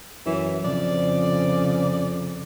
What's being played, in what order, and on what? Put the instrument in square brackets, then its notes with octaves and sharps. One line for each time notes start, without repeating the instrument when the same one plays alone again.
[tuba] F#2 [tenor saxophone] E3
[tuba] F2 [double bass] C#3 [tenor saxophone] D5